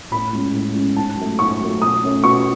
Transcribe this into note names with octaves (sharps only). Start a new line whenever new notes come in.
A2 B5
G#3 C#4
A2
G#3 C#4
G#2 A5
F#3 A3
G#2 C#6
F#3 A3
B2 D#6
A3 C#4
B2 C#6